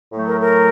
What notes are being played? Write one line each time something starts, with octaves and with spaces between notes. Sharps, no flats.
A2 F#3 A3
A#4
A#4